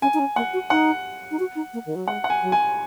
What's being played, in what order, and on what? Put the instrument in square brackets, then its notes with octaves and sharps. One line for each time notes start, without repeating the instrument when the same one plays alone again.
[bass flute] C#4 [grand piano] G#5
[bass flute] D#4
C#4
[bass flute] A#3 [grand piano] F#5
[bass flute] F#4
[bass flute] D#4 [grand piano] F#5
[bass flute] D#4
F#4
D#4
A#3
D#3
F#3
[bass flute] G#3 [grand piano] F#5
[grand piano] F#5
G#5
[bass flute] F#3
[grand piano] G#5